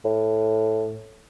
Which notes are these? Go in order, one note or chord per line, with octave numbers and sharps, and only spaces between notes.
A2